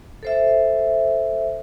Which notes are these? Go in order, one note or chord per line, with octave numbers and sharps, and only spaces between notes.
A4 C5 E5